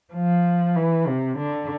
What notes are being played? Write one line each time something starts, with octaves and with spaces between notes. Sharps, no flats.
F3
E3
C3
D3